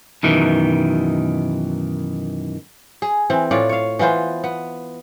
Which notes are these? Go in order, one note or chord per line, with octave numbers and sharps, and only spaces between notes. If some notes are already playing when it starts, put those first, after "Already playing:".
F#2 B2 D#3 E3
G#4
E3 C4
A2 F4 C#5 D5
C#5 F5
E3 B3 F4 C5
B3